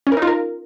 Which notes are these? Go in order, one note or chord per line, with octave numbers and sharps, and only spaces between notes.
C#4
A#4
D#4
F4
A#4